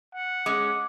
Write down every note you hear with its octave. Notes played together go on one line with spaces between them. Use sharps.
F#5
G#3 C#4 D6